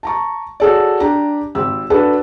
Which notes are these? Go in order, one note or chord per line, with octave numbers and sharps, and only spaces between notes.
A5 A#5 C#6
F#4 G#4 A4 C#5 D5
D4 G4 A#5
G#1 G4 E6
D4 F#4 A4 B4